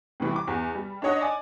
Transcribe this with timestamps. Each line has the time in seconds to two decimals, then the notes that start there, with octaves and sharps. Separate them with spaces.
0.20 A2 C3 E3 G3
0.36 D6
0.47 E2
0.75 G3
1.02 D4 D#4 C#5 D#5 F#5
1.21 D5 G#5